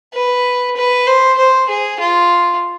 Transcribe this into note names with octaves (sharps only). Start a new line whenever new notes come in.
B4
B4
C5
C5
G#4
F4